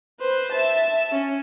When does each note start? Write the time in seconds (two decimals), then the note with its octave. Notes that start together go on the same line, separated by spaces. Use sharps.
0.20 B4 C5
0.52 E5 A5
1.12 C#4